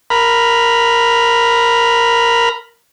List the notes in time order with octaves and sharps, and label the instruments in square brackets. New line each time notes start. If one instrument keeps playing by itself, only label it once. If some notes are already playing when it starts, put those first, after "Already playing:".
[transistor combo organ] A#4 B5